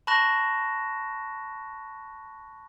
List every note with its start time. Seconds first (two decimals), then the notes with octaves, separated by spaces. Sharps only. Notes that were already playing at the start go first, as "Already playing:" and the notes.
0.07 A5 B5 C#6 F#6 A#6 E7